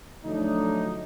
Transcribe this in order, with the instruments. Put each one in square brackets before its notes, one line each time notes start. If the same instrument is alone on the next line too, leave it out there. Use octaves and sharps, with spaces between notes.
[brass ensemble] D3 F3 F#3 A3 D4 D#4